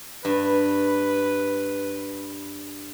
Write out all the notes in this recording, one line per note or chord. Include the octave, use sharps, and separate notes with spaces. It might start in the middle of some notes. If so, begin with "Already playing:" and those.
G2 B4